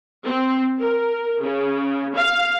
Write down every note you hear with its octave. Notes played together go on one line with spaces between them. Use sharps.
C4
A#4
C#3
F5